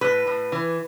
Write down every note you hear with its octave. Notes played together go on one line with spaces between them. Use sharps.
A2 B4
A2
E3